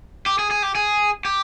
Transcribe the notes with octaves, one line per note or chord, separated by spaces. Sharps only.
G4
G#4
G#4
G4
G#4
G4